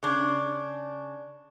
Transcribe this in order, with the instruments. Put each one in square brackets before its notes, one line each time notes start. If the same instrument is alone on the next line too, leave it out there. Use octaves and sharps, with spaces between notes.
[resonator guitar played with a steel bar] C#3 D4